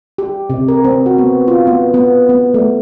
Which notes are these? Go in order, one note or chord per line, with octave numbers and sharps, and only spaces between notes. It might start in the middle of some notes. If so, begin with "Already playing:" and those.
G4
C3
A#4
C4
F#4
B3
F4
B3
B3
B3
A3